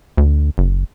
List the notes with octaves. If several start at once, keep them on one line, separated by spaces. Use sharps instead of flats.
D2
F#1